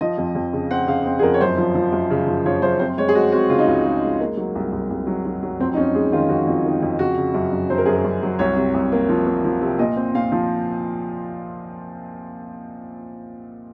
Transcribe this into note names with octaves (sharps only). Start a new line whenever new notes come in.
F3 D#5
F2
F2
C#3
C4 F#5
C#3 F5
C4
G#4
F2 A#4
C#5
F#2 C5
F3
F3
F#2
C#3
F3
F3 C#5
F#2 C5
C4 C5
G#3 C#5
G#4
G#3 F#4
C4 F#4
C#3 F4
D#4
C#2 F4
G#3
G#3
A#3
F#3
C2
C2
C2
F#3
F#3
F#3
F2 C4
D#4
F2 C#4
G#3 G#4
D#3 F4
F2 F#4
F2
D#3
F2
C#3 F#4
C#3
F#2
F#2
F#3 C5
A#4
F#2 G#4
A#4
F#2
F#3
C2 C#5
C3
C2
A#3
F3
A#3
F3
C3
A#2 D#5
C4
A#2 F5
F3